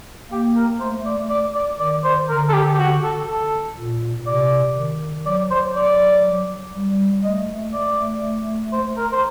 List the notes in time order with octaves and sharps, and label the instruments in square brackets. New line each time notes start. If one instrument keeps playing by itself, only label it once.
[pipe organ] A#3 [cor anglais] G4
[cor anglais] A#4
[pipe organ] A3 [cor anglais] C5
[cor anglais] D5
D5
D5
[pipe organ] D#3 [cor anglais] D5
[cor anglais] C5
[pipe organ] D3 [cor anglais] A#4
[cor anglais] A4
G4
G4
F#4
A4
A4
[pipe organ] A#2
[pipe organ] C3 [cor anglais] D5
[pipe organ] D#3
[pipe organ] F#3 [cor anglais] D5
[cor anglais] C5
D5
[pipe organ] G3
[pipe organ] A3 [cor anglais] D#5
[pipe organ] A3 [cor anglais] D5
[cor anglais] C5
A#4
C5